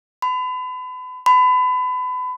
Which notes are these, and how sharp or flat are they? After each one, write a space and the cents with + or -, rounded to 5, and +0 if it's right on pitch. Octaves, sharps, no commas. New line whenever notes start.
B5 +35
B5 +30